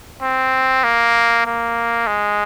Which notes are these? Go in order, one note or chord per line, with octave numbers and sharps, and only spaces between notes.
C4
A#3
A#3
G#3